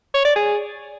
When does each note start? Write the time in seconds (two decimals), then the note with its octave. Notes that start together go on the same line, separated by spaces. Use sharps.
0.14 C#5
0.25 D5
0.36 G#4